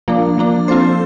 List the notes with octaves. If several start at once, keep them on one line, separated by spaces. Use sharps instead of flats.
F3 A#3 D4
F3 A#3 D4
C4 F4 A4 C5